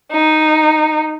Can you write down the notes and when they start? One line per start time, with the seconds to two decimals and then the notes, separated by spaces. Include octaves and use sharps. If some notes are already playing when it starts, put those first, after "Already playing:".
0.12 D#4